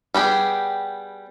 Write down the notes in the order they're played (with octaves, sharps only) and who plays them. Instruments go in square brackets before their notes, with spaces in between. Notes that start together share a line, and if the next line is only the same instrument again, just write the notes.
[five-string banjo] G3 B3 G4 G#4